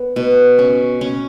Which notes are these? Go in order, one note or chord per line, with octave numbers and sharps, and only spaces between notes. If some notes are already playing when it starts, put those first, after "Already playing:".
Already playing: B3
B2
C#4
C#4